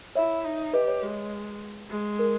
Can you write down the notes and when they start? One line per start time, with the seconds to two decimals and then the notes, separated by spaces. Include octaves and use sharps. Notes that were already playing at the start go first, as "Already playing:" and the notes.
0.15 E4 C#5 E5
0.45 D#4
0.73 G4 B4 D#5
0.88 C#5
1.03 G#3 B4
1.90 G#3
2.19 A#4